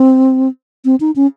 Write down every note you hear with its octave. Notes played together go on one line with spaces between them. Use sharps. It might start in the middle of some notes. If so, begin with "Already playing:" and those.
Already playing: C4
C4
D#4
C#4